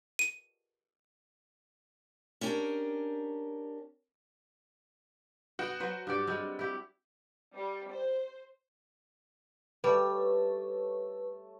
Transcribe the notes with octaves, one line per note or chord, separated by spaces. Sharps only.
D#7
C#4 D4 G4 A#4
B3 F#4 G5
F#3 B4 C5
G2 G4 D5
G3 G#3 C4
E4 G4
G3
C5
G3 A3 B4 C#5 A5